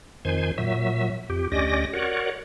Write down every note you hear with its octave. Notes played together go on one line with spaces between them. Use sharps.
F2 D#3 C5 G#5
A#2 F#3 E5
F2 G4
D2 C#4 G4 D5 D#5 A#6
F#4 A#4 C#5 D5 F#5